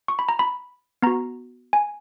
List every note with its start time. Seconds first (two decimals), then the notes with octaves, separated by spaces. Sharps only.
0.08 C#6
0.19 B5
0.29 A#5
0.39 B5
1.02 B3 F#4 A#5
1.73 G#5